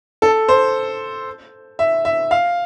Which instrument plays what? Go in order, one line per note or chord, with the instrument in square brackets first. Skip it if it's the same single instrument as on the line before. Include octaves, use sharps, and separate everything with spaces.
[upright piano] A4
C5
E5
E5
F5